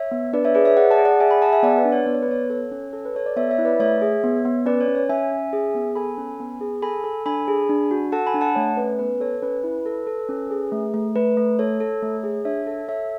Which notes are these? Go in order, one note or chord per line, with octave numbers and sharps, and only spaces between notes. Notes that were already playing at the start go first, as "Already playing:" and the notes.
Already playing: C#5 E5
B3
D4 B4 D5
C#5 E5
G#4 B4 D5
C#5 E5
G#4 D5 F#5
F#5 A5
G#4
D5 F#5
G#4 E5 G#5
G#5 B5
G#4 F#5 A5
E5 G#5
B3 D5 F#5
B4 D5
D4
C#5
B3 D5
C#5
B4
B3 C#5
A4 C#5
C#4
A4
B4
A4 C#5
D5
B3 C#5 E5
C#5 E5
E4
B4 D5
A3 C#5 E5
G#4
B3
B3
C#4 B4 D5
C#5
C#4
C#5
C#4 E5 G#5
C#4
G#4
B3
A4 G#5 B5
C#4
B3
G#4
A4 G#5 B5
A4
D4 G#5 B5
G#4
D4
F#4
A4 F#5 A5
G#5 B5
D4
F#5 A5
A3 C#5
C#4 B4
B3 B4
A4 C#5
C#4 B4
E4
A4
A4
C#4
G#4
A3
A3
A3 B4
A3
A4 C#5
A4
A3
G#4
D4 C#5 E5
A4
A4 C#5 E5